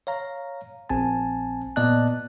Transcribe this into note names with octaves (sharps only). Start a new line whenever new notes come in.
C#5 F5 A#5
A#1 C4 G#5 A5
A#2 B3 D5 D#5 A5 F#6